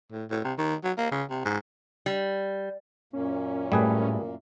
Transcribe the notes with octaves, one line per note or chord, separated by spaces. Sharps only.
A2
A2
C3
D#3
F#3
A#3
C#3
C3
G#2
G3
F#2 A#2 A#3 C#4
A2 G3 G#4 B4